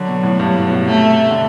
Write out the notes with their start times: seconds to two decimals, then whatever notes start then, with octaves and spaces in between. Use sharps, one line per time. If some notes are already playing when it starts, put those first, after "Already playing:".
Already playing: D3 F#3
0.08 B2
0.23 A2
0.40 G2
0.54 A2
0.70 B2
0.85 C3 A3
1.31 D3